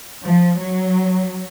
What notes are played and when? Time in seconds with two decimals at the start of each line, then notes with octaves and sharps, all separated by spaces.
0.23 F3
0.58 F#3